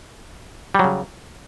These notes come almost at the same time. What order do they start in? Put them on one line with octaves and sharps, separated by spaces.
G3 F#3 C#3